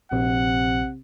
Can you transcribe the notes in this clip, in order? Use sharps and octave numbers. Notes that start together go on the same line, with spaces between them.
A#1 C3 F#5